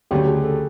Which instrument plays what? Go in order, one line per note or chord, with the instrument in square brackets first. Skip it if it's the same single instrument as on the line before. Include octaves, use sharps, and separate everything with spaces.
[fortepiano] D2 C#3 F#3 A3 [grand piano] G4
[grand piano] G#4
A4